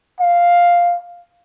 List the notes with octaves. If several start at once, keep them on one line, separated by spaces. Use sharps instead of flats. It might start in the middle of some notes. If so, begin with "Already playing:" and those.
F5